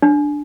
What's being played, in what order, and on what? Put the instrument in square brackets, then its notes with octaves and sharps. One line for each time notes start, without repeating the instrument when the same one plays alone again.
[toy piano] D4